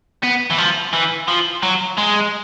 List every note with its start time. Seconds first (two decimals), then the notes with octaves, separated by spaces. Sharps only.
0.23 B3
0.50 E3
0.58 F3
0.93 E3
1.28 F3
1.63 F#3
1.98 G#3